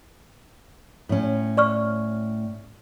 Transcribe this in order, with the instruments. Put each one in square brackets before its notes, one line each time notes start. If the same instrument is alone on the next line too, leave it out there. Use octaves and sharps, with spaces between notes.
[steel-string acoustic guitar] A2 C#4
[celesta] D5 C#6 F6